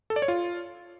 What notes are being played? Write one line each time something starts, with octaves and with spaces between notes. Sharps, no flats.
A4
D5
C#5
F4